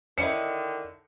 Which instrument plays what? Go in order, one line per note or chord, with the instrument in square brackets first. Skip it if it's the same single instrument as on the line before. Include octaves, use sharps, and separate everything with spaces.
[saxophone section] D3 D#3 [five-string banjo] C#4 D#4 E4 [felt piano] C#7